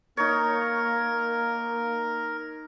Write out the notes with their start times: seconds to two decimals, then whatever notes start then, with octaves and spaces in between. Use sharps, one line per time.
0.17 A#3 D#4 A#4 C#5